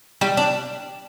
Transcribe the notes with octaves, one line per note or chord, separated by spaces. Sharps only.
G3
D4